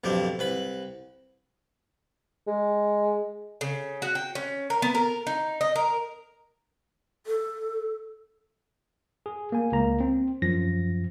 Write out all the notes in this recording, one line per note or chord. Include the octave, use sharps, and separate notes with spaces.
B1 F2 D3 G4
C2 B4 B5
G#3
C#3
F#4
G5
C#4
A#4
B3
A#4
D#4
D#5
A#4
A4
G#4
A#3 G#5
C#2 A#3 A#5
C4
F#2 F3 A#6